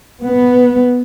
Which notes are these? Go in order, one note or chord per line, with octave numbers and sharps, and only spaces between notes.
B3